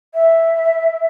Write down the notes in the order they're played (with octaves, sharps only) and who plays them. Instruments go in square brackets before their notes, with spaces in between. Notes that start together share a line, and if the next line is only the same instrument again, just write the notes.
[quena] E5